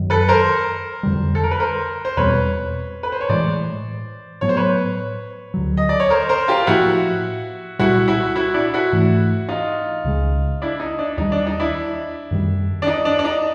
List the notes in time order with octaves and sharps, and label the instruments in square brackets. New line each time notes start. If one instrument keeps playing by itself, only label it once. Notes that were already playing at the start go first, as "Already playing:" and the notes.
Already playing: [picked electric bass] F#2 D#3 F#3
[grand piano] A4 B4
A#4 C5
[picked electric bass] F2 D3 G3
[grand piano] A4
A#4
B4
A#4 C5
C5
[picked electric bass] E2 B2 G3 C4 [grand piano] B4 C#5
[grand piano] B4
C5
C#5
[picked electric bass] A2 E3 G#3 [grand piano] C5 D5
[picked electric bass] A2 F#3 B3 [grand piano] C#5
[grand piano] C5
B4 C#5
[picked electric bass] D2 D3 F#3
[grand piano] D#5
D5
C#5
A#4 C5
A#4 C5
F4 G4
[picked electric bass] A2 F3 A#3 [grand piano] E4 F#4
[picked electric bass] C2 A#2 G3 [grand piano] E4 F#4
[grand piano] E4 F#4
E4 F#4
D4 E4
E4 F#4
[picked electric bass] G#2 E3 A3
[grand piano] D#4 F4
[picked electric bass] C#2 C#3 F3 G#3
[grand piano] D4 E4
D#4
D4
[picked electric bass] D#2 D#3 G3 [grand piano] D#4
[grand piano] D4
D#4
D4 E4
[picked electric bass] F#2 D#3 G3
[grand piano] D4
D#4
D4
D4
D#4